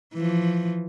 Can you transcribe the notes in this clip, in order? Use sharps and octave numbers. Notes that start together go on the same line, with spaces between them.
E3 F3